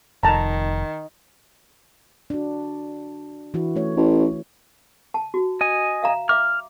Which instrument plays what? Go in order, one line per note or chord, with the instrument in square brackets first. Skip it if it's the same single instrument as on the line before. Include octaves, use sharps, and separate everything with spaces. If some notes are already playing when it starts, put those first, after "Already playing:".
[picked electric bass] F1 [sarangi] D#3 [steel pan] A5 A#5
[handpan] D4 F#4
E3 E4 F#4
A3 C#4 C#5
[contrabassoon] A1
[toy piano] A5
F#4
[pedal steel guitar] D#5 G#5
[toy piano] E5 F5 A#5
[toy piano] E5 D6 [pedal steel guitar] F6